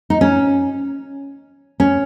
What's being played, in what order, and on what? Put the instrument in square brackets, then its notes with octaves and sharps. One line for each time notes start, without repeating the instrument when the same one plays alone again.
[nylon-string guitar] D#4
C#4
C#4